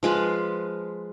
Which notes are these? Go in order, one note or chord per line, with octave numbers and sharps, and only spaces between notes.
F3 G#3 F4 B4